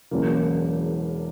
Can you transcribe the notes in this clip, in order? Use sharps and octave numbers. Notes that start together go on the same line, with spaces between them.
E1 E2 C#3 F#3 A#3